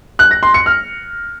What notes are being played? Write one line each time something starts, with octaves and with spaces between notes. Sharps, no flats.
F#6
A#6
C6
C#7
F6